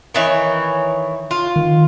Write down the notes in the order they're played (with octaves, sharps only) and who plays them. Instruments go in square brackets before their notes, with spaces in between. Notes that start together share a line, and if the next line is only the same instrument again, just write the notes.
[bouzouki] D#3 E3 C#5
F4
[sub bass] D#3